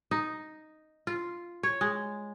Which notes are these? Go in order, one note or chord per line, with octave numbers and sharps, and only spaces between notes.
D#4
F4
C#5
G#3